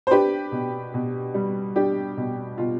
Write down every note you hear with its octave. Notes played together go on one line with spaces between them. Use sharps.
C5
D4 G4 B4
B2
B2
G3
D4 G4
B2
B2 F4